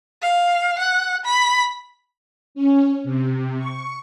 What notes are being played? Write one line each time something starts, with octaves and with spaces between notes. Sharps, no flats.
F5
F#5
B5
C#4
C3
C#6